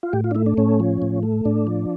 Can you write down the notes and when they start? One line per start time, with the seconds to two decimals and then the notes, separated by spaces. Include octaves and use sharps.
0.03 F4
0.13 A2 G4
0.24 F4
0.31 D4
0.35 A3 E4
0.46 D4
0.57 A2 C#4
0.80 F3
1.02 A2
1.23 A3
1.45 A2 D4
1.67 F3